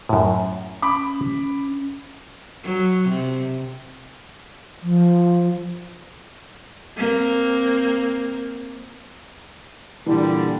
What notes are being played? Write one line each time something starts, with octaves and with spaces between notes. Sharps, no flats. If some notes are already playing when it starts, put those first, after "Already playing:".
F#2 A2
C#4 B5 D6
F#3
C3
F3
A#3 C4
A#2 D3 E3 G3